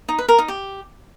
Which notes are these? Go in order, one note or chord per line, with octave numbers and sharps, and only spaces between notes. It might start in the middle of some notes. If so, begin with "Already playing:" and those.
D#4
B4
A#4
D#4
G4